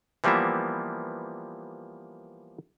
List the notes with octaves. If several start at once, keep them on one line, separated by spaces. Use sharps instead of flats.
E3 F3 G3 A#3 B3 E5